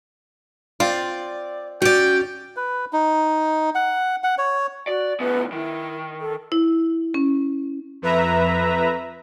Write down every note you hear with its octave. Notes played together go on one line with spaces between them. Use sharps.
C4 F4 D5
C#4 F#4 D5 G5
B4
D#4
F#5
F#5
C#5
F#4 D5
D2 B3 B4
D#3 E4
A4
E4
C#4
F2 B4 E5 A#5